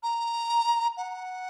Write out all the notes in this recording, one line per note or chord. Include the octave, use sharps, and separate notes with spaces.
A#5
F#5